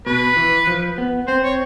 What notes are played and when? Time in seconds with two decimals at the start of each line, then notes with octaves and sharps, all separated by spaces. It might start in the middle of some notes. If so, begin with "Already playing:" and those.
0.06 B2 B4
0.37 E3
0.67 F3
0.98 B3
1.27 C4 C5
1.43 C#5